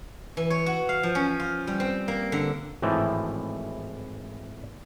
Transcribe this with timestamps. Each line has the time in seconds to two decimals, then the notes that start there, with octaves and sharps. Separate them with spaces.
0.37 E3
0.50 C#5
0.66 F#4
0.89 F5
1.03 F3
1.15 C#4
1.40 F4
1.67 G3
1.80 C4
2.08 A#3
2.32 D3
2.82 G#1 A2 E3 F3 G5 A5